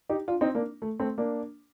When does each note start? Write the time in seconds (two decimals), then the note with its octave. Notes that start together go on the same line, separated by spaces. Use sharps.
0.09 D#4 G4
0.28 D4 F4
0.41 C4 D#4
0.55 A#3 D4
0.82 A3
1.00 A3 C4
1.18 A#3 D4